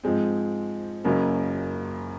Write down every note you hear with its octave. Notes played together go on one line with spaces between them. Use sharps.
G#2 F3 G#3 C4
F#1 F#2 C#3 F#3 A#3